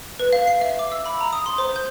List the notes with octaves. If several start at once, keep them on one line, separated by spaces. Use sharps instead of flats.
B4
F5
C7
E5
D6
E6
B5
A#5
D#6
C6
C5
G6